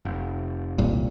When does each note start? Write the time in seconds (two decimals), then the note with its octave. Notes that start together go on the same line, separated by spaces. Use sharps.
0.05 F1
0.78 D#1 C2 A#2